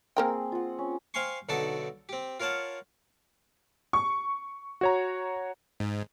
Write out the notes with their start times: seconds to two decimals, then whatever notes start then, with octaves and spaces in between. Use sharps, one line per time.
0.17 A#3 C4 G#4 A#4 G5
0.52 F4 F#5
0.78 C#4
1.14 C5 F5 G5 G#5 C6 C#6
1.49 B1 D3 D#4 F#4 A4 A5
2.09 C4 G4
2.40 F4 A#4 C#5 F#5 A5
3.93 C#6
4.81 F#4 C#5 A#5
5.80 G#2